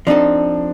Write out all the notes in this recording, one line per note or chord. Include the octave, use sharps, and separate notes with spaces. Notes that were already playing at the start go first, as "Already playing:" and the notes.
F3 C4 D4 D#4 A4